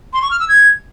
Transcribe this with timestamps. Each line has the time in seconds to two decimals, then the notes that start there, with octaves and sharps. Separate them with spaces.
0.13 C6
0.22 C#6
0.31 F6
0.40 E6
0.48 G#6